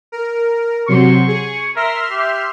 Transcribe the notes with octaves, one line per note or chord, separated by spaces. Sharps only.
A#4
C3 F#3 C6 C#6
G#4
A#4 E5 C6 F6
G4